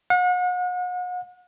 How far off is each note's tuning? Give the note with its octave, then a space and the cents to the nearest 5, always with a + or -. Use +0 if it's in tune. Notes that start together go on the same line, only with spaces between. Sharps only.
F#5 -40